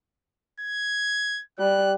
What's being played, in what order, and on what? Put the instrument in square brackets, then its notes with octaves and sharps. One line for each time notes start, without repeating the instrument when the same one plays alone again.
[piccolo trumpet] G#6
[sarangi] G3 [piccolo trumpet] F#6